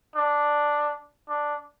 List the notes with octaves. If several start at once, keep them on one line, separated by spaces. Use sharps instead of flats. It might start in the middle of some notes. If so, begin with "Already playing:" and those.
D4
D4